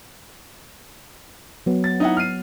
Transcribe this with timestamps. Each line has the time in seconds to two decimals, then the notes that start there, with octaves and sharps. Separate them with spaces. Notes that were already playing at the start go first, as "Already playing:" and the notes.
1.66 F#3 B3
1.84 A6
2.00 D#4 E4 F#5
2.17 F6 C7 D#7